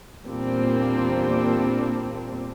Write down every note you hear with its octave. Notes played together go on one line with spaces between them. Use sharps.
E2 A#2 G3 A#3 C4 D4